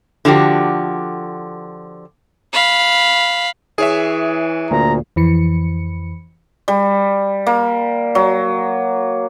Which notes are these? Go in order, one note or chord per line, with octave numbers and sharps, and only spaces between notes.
D3 F3 F#4 G4
F5 B5
E3 G#4 C#5 E5
D2 A#2 A#5
F2 E3 C#7
G3
A#3
F#3